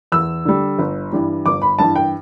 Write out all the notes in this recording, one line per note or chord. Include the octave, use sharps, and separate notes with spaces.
E2 E6
D3 G3
G1
G2 E3 G3
G1 D6
B5
G2 E3 A5
G5